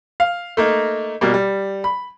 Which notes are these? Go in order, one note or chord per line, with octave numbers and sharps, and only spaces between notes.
F5
A3 A#3 D#4
B2 G3 A#3
G3
B5